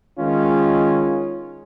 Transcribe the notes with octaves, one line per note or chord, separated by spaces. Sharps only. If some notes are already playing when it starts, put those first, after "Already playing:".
D#3 G#3 C#4 F4